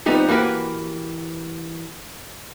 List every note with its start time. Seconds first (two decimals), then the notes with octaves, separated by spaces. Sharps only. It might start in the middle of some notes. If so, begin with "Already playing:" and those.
0.06 F3 G3 B3 C4 D#4 G4
0.28 E3 A#3 F#4 G4 B4